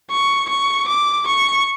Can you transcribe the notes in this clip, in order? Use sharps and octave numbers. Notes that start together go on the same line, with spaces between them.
C#6
C#6
D6
C#6